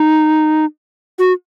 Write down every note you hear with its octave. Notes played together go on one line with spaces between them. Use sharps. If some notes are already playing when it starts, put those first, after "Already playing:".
Already playing: D#4
F#4